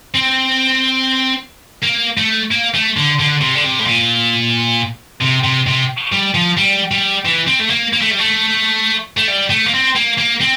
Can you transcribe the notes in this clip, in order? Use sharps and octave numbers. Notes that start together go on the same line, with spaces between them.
C4
A#3
A3
A#3
A3
D3
D3
C3
D3
C3
A2
A#2
C3
C3
C3
G3
F3
G3
G3
E3
C4
A3
A#3
A#3
A3
G3
A3
A3
G3
A3
A#3
C4
A#3
A#3
C4